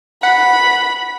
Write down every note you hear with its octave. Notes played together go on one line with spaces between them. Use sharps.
F#5 B5